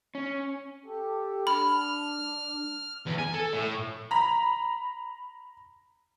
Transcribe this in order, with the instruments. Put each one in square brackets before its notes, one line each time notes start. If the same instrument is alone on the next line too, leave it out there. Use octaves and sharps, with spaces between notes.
[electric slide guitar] C#4
[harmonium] G4 A4
[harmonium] D4 [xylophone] B5 [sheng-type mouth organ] F6
[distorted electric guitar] E2
G#5
A4
A2
[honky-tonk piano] A#5 B5